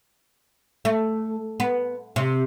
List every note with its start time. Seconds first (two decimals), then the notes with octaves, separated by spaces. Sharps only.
0.85 A3
1.60 B3
2.16 C3